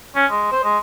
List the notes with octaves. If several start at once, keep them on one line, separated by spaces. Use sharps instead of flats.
C#4
G#3
C5
G#3